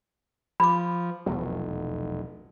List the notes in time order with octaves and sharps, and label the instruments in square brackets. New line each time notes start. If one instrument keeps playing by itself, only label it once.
[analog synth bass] F3 [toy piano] B5 D6
[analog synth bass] F1 [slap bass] B1 E2 F#3